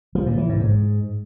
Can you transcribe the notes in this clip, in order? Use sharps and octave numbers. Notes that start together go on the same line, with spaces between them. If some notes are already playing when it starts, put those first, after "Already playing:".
F3
A#2
E3
G#2
G#2